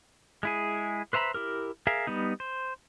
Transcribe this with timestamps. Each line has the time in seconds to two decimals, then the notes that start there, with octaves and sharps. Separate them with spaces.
0.43 G#3 E4 G#4
1.13 B4 C5 E5 A#5 B5
1.34 E4 G4 A#4
1.87 G#4 A#4 E5 F5
2.07 G3 B3 D#4
2.40 C5